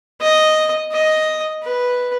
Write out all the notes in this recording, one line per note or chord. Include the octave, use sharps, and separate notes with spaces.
D#5
D#5
B4